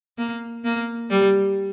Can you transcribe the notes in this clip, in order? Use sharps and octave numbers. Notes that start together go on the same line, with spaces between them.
A#3
A#3
G3